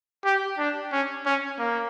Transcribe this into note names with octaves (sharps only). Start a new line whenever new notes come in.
G4
D4
C#4
C#4
A#3